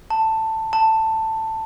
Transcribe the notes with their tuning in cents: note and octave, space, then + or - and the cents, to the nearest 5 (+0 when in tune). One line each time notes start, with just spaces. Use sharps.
A5 +10
A5 +10